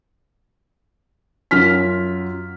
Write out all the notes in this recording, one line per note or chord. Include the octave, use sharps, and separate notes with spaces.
F#2 F4 F6 B6